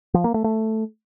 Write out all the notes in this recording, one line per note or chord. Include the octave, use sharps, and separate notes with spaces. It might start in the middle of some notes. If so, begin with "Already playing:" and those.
F3
A#3
A3
A3